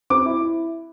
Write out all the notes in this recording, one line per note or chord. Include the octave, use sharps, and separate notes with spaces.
C4 D6
E4
E4